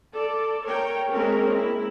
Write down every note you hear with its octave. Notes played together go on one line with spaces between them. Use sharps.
A4 D5
A#4 C#5 G5
G#3 A#3 C4 C#4 A#4
E4